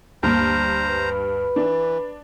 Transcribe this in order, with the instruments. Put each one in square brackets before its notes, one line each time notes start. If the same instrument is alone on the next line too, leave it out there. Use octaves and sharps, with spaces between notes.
[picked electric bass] D2 A#3 [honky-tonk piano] G2 [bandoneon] C5 A#5
[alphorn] B4
[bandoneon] E3 [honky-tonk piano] D4